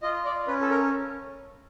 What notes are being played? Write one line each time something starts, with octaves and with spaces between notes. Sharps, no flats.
F4 D#5
D5
C#4 B4
A4
A#4